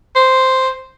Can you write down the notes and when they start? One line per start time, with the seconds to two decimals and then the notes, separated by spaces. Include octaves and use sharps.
0.16 C5